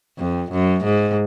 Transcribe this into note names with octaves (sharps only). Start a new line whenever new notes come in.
F2
F#2
G#2